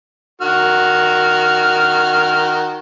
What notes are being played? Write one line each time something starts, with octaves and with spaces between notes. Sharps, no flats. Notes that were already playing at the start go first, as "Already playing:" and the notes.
D#3 F#4 F6